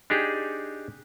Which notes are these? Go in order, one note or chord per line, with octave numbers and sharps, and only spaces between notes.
D4 D#4 G4 G#4